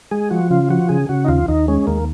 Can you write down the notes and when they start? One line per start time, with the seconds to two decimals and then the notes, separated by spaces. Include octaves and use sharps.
0.11 G#3 G#4
0.31 F3 F#4
0.51 C#3 F4
0.69 F3 F#4
0.89 C#3 G#4
1.09 C#3 F#4
1.25 D#4
1.28 D#2 F4
1.48 D#2 D#4
1.68 G#3 C#4
1.87 D#2 A#3